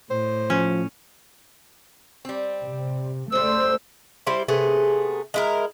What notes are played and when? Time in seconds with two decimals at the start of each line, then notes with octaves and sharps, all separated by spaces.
0.10 A2 C5
0.50 F3 C#4
2.25 G3 C4
2.62 C3
3.32 C#3 G3 A3 C5 E6
4.27 G3 E4 G4 C5
4.48 C3 A3 B3 G#4
5.34 G#3 E4 A#4